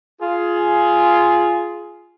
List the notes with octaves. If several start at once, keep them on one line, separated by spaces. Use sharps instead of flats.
F4 G#4